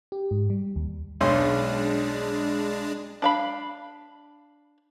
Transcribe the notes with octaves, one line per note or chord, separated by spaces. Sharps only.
G4
G#2
G3
D#2
B1 G#3 C#4 D4 C6
D4 F5 B5